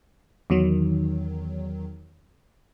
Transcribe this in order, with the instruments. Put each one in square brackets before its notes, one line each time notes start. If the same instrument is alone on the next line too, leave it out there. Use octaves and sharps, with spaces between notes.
[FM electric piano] E2 D#3 F#3